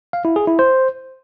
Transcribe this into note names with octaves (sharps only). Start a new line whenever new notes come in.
F5
E4
G#4
E4
C5